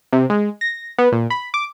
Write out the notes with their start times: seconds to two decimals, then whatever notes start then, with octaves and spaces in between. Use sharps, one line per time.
0.13 C3
0.30 G#3
0.61 A#6
0.98 B3
1.12 A#2
1.30 B5
1.54 D6